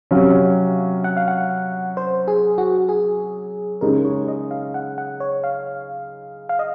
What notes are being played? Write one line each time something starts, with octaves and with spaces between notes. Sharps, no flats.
C3 F#3 C#4 F5
F#5
F5
F#5
C5
G#4
F#4
G#4
C#3 G#3 D#4 A#4
C#5
D#5
F5
F#5
F#5
C#5
F5
F5
D#5